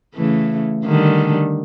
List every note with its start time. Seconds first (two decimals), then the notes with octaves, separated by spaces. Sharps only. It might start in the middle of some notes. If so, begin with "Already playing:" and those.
0.14 C#3 E3 A3
0.85 D3 D#3 G3